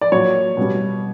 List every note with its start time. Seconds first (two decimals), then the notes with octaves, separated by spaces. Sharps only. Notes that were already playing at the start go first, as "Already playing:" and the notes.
0.01 D5
0.12 A#2 F#3 C#5
0.57 B2 G3